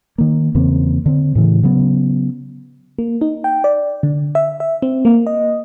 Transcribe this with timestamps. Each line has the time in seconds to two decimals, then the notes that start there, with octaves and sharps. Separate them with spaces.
0.18 D#3 A#3
0.55 E2 C#3 A#3 C4
1.06 D3 C4
1.35 A2 C#3 E3
1.63 C#3 F#3 B3
2.99 A#3
3.21 D#4
3.44 G5
3.64 D5
4.03 D3
4.35 E5
4.60 E5
4.82 C4
5.05 A#3
5.27 D#5